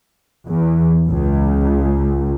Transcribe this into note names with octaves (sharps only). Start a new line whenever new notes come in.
E2
C#2